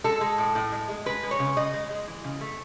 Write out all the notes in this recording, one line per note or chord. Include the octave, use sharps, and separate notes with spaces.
G#3 A4
G#3
A2
A2
G#3
G#3
G#3 B4
G#3
C#5
C#3
C#3 D#5
G#3
G#3
E3
C#3
A3